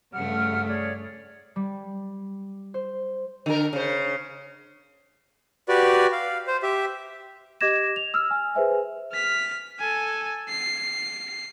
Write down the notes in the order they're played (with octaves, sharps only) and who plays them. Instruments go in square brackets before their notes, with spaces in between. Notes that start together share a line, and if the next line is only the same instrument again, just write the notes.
[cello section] G2 C#3 A3 [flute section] F#5 F6
[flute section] G#4 C#5 D5
[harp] G3
C5
[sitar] D3 A#4
C#3 C5
[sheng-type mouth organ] F#4 G4 B4 D5
F5
C5
G4 E5
[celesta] G4 D#5 D6 G#6 A#6 E7
F7
E6 F6
G#5
G#4 B4 C5 E5 G#5
[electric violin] F6 B6
A4 G#5
C7